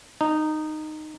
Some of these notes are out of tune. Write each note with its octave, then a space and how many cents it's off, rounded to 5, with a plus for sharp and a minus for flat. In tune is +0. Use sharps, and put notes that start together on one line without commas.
D#4 -15